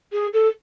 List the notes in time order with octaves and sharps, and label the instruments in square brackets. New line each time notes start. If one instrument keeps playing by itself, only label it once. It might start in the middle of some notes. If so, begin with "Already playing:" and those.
[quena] G#4
A4